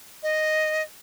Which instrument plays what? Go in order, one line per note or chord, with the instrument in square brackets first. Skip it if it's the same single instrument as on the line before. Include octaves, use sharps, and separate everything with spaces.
[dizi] D#5